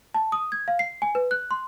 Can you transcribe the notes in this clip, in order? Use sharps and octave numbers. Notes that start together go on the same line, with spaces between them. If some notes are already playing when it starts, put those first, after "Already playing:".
A5
D#6
G#6
F5
C7
G#5
B4
F#6
C6